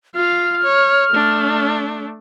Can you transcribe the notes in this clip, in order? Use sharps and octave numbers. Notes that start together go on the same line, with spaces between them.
F4 F5 F6
C#5
A3 D4